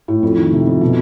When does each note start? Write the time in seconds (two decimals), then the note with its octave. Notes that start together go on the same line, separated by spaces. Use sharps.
0.08 A2
0.23 F2
0.37 D#3
0.52 C3
0.67 F2
0.81 B2